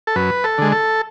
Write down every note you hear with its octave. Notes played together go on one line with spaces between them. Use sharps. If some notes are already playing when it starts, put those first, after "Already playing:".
A4
F#2 B4
A4
D3 G#3
A4